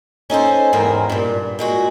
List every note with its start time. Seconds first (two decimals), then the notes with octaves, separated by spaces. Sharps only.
0.30 C#4 D#4 A4 C5
0.73 E2 G#2 C4 A#4
1.10 G2 A#2
1.59 A#2 G#3 F#4